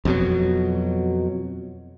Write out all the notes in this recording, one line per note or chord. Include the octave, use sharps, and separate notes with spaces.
F2 B2 F#3